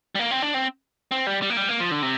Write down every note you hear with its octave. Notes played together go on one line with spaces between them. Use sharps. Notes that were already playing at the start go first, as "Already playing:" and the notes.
G3
A#3
C4
D4
C4
C4
G3
G3
A#3
G3
A#3
F3
D3
C3